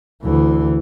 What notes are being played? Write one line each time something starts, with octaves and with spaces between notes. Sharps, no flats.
D2 E3